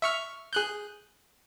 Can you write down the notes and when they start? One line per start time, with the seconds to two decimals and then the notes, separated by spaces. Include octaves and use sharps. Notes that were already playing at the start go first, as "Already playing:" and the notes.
0.02 E5 C#6 F6
0.53 G#4 F#6 G6